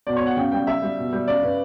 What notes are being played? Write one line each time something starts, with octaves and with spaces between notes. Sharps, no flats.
B2 D5
C#5
B2
F#5
C#3 G5
G3 G5
G3 E5
G3
B2
G3
C#3 D5
C#3 B4